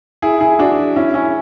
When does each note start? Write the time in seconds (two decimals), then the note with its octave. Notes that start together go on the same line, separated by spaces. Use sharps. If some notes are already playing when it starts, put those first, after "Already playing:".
0.22 E4 G#4
0.41 E4 G#4
0.59 D4 F#4
0.96 C#4 E4
1.14 C#4 E4